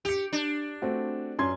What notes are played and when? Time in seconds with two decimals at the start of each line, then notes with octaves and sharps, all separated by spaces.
0.05 G4 C#7 F7
0.33 D4
0.82 A3 C4 F#4
1.39 F#2 C6 G#6